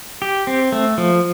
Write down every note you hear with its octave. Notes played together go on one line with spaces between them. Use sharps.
G4
C4
A3
F3